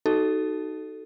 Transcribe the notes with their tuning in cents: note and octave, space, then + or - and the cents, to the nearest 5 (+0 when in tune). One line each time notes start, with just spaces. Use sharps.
D#4 +0 F#4 +30 A4 +0